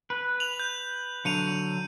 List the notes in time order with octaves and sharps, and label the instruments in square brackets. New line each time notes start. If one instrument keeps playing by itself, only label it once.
[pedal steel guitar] B4
[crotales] F7 F#7
G6
[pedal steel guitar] D3 F#3 [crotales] C#7 D#7 F7